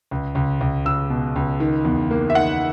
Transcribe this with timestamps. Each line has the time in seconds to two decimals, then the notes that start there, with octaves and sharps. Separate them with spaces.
0.11 C#2
0.35 C#2
0.61 C#2
0.85 C#2 E6
1.10 B2
1.36 C#2
1.60 D#3
1.85 E2
2.11 A#3
2.30 E5
2.35 D#3 F#5